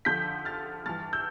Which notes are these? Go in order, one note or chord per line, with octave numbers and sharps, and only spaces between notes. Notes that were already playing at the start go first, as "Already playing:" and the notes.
F2 D3 F3 G6 B6
F6 A6
G2 E3 F6 A6
E6 G6